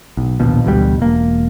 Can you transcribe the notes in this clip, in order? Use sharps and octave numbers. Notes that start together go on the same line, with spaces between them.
B1
A#1 D#2 B2 F3
A1 D2 B2 G3
E1 A#3